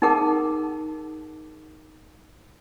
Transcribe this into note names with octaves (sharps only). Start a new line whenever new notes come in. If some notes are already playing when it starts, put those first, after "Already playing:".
D#4 G#4 A#4 F#5 A5 D6